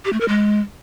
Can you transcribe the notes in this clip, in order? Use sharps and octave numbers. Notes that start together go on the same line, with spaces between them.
G4
A3
A#4
G#3